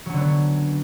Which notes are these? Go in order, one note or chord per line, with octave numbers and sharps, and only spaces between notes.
D3 F#3 B3 C#4